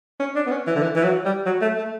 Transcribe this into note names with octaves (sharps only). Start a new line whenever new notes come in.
C#4
D4
B3
C#4
E3
D3
E3
E3
F#3
G3
F#3
A3
A3